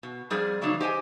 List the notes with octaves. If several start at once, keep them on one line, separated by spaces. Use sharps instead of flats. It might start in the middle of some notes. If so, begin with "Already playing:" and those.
B2
F2 G3 G#4 C5 D5
C#3 E3 F#3 A#3 D4 D#4
G4 C5 D#5 G5 G#5